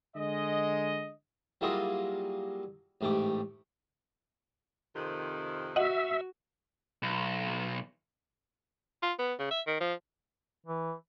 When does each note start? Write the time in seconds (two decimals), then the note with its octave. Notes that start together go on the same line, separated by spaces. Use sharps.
0.15 D3 G#3 D#5
1.61 F#3 G3 A#3 E4 F4 G#4
3.01 A1 G#2 A3 G4 D6
4.95 F2 C3 D#3
5.76 F#4 D#5 E5 F#5
7.03 B1
9.03 F4
9.19 B3
9.39 C#3
9.51 E5
9.67 D#3
9.80 F3
10.66 E3